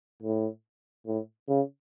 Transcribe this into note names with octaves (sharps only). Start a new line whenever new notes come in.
A2
A2
C#3